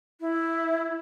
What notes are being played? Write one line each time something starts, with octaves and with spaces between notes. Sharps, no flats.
E4